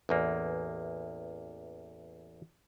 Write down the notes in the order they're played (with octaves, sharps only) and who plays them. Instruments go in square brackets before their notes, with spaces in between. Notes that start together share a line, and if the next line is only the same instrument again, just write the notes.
[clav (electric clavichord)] A1 E2 A#3